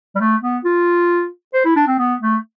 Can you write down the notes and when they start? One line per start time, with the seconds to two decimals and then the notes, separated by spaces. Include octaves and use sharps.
0.16 G3
0.21 A3
0.43 B3
0.65 F4
1.54 C5
1.65 E4
1.76 D4
1.88 C4
1.99 B3
2.21 A3